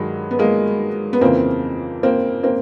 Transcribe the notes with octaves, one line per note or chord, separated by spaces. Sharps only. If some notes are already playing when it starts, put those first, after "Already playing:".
Already playing: G2 D#3 F#3 G#3
B3
G#3 A#3
B3
F2 C#3 E3 A#3 C4
A#3 C4
A#3 C4